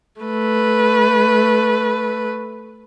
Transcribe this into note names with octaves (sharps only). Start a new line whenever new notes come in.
A3 B4